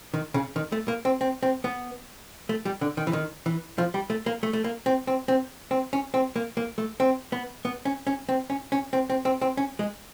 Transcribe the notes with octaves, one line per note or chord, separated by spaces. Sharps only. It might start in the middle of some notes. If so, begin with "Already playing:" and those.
D#3
C#3
D#3
A3
A#3
C4
C4
C4
B3
A3
G3
D3
D#3
E3
D#3
E3
F3
G3
A3
A#3
A3
A3
A#3
C4
C4
C4
C4
C#4
C4
A#3
A#3
A3
C4
B3
B3
C#4
C#4
C4
C#4
C#4
C4
C4
C4
C4
C#4
G#3